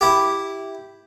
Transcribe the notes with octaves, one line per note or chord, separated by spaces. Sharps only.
E4 G4